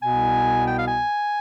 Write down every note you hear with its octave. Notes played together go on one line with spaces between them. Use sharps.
C2 B2 B3 G#5
G5
F5
G#5